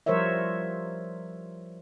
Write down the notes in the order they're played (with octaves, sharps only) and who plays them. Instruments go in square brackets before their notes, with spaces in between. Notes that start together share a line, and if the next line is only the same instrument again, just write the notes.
[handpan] F3 G3 A#4 C5 C#5 E5